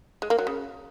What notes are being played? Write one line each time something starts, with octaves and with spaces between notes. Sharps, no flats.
G#3
A#3
F#3
C#3